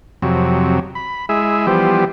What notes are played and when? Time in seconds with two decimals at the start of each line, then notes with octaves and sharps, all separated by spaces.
0.22 F2 C3 F#3
0.95 B5
1.29 G#3 E4 G#4 E5
1.67 E3 F3 G3 B3 G4 C5